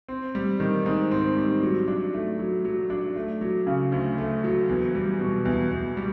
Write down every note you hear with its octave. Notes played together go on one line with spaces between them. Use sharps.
C4
G3
D#3
G#2
C4
G3
F#3
D4
A3
F#3
F#3
D4
A3
F#3
C#3
D2
A3
F#3
E2
G3
B2
E2
E2
G3